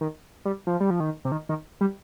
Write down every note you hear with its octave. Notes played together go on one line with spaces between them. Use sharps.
D#3
G3
F3
G3
F3
D#3
C3
D#3
D#3
G3